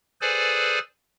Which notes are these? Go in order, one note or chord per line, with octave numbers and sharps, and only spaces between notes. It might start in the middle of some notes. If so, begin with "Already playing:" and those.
G#4 A4 B4 C5 D5 G#5